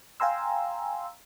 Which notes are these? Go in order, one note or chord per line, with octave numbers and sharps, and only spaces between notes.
F5 G5 G#5 A#5 C6 E6